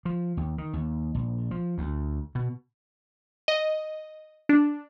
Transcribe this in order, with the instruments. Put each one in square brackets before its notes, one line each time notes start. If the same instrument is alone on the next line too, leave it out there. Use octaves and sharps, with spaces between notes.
[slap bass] F3
D#2
D#3
D#2
A#1
F3
D2
B2
[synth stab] D#5
D4